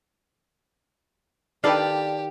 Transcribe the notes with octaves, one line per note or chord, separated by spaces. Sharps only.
D#3 D4 G4 A4 B4 D5 F5 A5